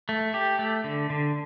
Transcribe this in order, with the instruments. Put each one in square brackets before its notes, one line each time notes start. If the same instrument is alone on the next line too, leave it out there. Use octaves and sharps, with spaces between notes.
[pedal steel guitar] A3
G4
A3
D3
D3